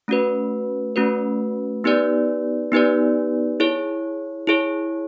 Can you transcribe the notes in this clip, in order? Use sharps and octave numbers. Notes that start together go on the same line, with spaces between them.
A3 C#4 F#4 B4
A3 C#4 F#4 B4
B3 D#4 G4 B4 D5
B3 D#4 G4 B4 D5
E4 G#4 C#5
E4 G#4 C#5